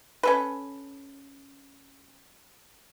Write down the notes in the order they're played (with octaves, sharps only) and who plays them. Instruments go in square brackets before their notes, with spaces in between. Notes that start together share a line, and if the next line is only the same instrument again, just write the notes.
[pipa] C#4 A4 B4